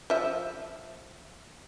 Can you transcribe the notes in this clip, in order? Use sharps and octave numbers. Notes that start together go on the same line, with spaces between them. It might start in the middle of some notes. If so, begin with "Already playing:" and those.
F3 E5